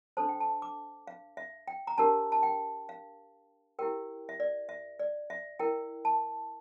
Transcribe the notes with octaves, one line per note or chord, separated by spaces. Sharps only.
D4 A4 C5 A5
G5
A5
D6
F5
E5
G5
A#5
D4 G4 A#4 A5
A5
G5
F5
E4 G4 A#4 G5
E5
D5
E5
D5
E5
E4 A#4 G5
A5